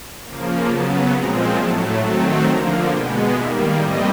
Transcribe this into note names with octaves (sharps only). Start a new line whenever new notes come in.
C#3 F3 A#3
C#3 F#3 B3 A5
A#2 F3 G#3 C4 A#5
A2 F#3 A3 A5
D#3 F#3 A3 C4 A5
D3 F3 A#3 A#5
B2 G#3 B3 G5
D#3 G3 A#3 E5
A2 E3 G3 C4 D#5